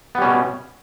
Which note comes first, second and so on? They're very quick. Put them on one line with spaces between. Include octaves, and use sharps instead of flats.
B3 G3 C#4 B2